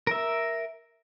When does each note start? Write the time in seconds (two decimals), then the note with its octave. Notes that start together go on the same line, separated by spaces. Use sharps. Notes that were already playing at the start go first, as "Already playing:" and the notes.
0.07 A#4 E5